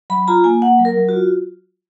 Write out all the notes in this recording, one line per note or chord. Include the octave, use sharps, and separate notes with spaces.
F#3 B5
F4 A#5
A#3 G#5
A#3 F#5
F#3
A#4
F#3
F4 F#4